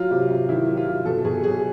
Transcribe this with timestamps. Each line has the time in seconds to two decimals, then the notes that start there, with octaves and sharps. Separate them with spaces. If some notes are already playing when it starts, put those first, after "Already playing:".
Already playing: F#3 F4
0.11 C3
0.30 C3
0.49 D#3 E4
0.68 F#3
0.77 F4
0.87 C3
1.05 B2 A4
1.24 B2 G#4
1.43 F#3 G#4